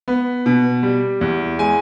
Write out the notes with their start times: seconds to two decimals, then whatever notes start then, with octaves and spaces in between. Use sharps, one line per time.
0.08 B3
0.46 B2
0.83 G3
1.21 E2
1.59 G#3 G#5